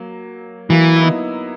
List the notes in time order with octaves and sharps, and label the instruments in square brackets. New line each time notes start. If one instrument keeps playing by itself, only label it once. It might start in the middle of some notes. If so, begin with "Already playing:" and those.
Already playing: [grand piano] F#3 A#3
[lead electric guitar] E3 [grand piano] F#3 A#3
[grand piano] E4
B3 D#4